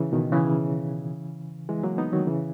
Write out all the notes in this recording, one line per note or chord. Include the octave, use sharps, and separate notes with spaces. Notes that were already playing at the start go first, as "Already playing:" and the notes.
Already playing: C#3 E3
B2 D#3
C#3 E3
E3 G#3
F#3 A#3
B3 D#4
D#3 F#3
C#3 E3